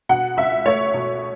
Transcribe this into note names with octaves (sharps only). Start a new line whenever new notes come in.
B2 F#5
C#2 E5
A3 C#5
B2